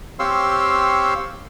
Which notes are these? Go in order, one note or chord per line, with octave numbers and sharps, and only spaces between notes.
C4 G4 C#5 F5 C6 E6